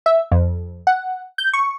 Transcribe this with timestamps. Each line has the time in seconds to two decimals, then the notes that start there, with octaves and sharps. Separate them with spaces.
0.06 E5
0.32 F2
0.87 F#5
1.38 G6
1.53 C#6